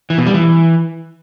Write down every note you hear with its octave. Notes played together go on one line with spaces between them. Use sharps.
E3
B2
G3
E3